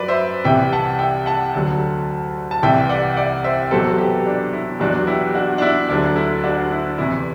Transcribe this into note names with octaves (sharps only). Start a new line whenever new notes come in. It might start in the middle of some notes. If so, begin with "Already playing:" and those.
Already playing: F#2 F#3 B4 D5
C5 E5
C2 C3 E3 E5 G5
F#5 A5
E5 G5
F#5 A5
D2 D3 F#3
A5
C2 C3 E3 E5 G5
D5 F#5
D5 F#5
C5 E5
E2 B2 F#3 A4 C5
G4 B4
D4
E4
E2 B2 F#3 D4 F#4
E4 G4
D4 F#4
D4
E4
D2 D3 F#3 D4
E4
D4 F#4
E4
E2 C3 E3 E4